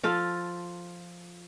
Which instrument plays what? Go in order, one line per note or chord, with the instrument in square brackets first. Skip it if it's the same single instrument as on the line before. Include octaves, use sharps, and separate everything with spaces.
[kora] F3 F4 A4